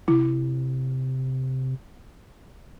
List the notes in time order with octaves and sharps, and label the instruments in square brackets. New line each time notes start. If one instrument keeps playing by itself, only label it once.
[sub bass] C3 [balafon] E4